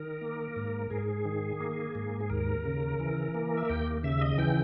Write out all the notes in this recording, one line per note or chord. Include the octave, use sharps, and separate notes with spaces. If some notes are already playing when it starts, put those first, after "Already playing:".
Already playing: D#3 A#4
A#3
G#2
G#2 G#4
D#3
A#3
G#2
G#4
D#2 A#4
C#3
E3
A#3
E5
D#2 G5
C#3 E5
D#5
E3 G5